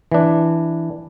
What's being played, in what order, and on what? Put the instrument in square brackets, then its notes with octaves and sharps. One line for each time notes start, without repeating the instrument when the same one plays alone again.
[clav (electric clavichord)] E3 D4